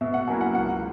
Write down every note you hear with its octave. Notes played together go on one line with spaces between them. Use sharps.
B2 E5
F#5
F#3 A#3 C#4 E4 G#5
F#5
C#2 F#5